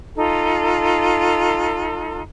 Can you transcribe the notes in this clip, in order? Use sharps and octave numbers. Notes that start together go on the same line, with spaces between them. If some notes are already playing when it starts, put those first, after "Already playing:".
D#4 F4 A4